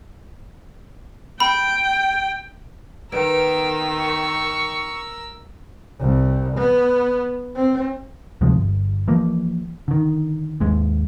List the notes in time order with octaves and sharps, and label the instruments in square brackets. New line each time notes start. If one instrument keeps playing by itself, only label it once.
[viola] G5 [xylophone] B5
[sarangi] D#3 [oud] B3 [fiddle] A#4 E6 [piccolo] D7
[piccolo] C#6
[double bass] C2
B3
C4
[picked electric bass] D2 C3 F3 G#3
G1
E3 F3 A#3
D3 D#3
G#1 D#2 G#3